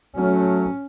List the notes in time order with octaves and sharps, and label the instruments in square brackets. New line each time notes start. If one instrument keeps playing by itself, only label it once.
[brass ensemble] F#3 A3 [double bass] C#4